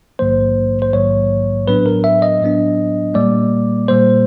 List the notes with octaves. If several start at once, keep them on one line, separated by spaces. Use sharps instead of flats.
A#1 G#2 D#3 F#3 A#3 C5
C5
A#1 G#2 D#3 F#3 A#3 C#5
A2 F#3 B3 D4 B4
A#4
E5
D#5
A2 F#3 B3 D4
A#2 G3 A#3 D5
A#2 G3 A#3 C5